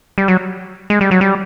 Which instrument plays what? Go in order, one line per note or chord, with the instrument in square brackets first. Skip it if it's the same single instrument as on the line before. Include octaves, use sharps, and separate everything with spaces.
[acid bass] G3
F#3
G#3
G3
F#3
G3